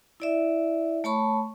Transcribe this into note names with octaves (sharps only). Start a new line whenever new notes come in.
E4 D5 E5
A3 C#5 A5 B5 C#6